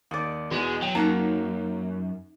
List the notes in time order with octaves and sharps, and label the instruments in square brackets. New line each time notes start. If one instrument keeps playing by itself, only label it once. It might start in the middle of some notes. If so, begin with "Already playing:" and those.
[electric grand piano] D#2 [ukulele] D#4 D5
[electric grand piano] E2 B2 B3 [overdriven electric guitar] G#3 [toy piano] F#4
[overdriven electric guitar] F#3 [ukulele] G5
[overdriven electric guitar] F#2 [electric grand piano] A#3 [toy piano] D#4 [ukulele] F#4 F#5 A#5